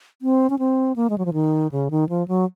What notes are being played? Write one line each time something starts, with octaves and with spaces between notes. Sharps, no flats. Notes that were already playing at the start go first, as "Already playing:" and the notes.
C4
C#4
C4
A#3
G#3
F#3
F3
D#3
C#3
D#3
F3
F#3